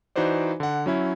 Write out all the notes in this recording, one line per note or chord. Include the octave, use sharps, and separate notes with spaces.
E3 D#4 F#4 B4 C5 D5
D3 F#5
F#3 C#4 E4